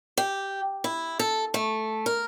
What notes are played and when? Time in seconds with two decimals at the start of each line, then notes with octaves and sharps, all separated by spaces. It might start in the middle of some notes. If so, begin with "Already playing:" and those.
0.17 G4
0.84 E4
1.19 A4
1.54 A3
2.06 A#4